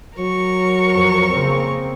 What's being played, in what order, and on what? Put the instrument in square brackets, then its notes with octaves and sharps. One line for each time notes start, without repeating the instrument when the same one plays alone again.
[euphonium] F#3 [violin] A#4 C#6
[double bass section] F2
C#3 A#3 C4